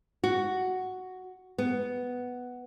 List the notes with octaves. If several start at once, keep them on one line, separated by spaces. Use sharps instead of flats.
F#4
B3